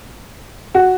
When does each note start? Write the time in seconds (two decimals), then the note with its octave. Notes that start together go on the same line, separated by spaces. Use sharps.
0.75 F#4